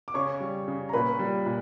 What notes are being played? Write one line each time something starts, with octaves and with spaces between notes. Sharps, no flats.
D6
C#3 C#5 C#6
G3
C#3
A#5
A#2 B4 B5
G3
A#2